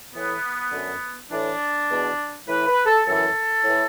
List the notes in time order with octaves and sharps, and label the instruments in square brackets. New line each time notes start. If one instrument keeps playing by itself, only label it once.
[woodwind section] A2 E3 B3
F#2 D3
A2 E3 D4
E2 B2
A2 E3 B4
B4
A4
F#2 E3 A4
A2
E3